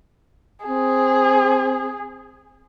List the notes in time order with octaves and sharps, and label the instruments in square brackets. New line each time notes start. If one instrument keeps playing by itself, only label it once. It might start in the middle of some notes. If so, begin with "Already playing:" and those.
[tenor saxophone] C4 [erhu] G#4